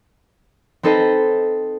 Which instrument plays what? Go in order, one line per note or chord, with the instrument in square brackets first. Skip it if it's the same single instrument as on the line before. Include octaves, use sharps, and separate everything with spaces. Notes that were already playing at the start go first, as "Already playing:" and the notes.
[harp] C4 D#4 A4 B4 C5 D#5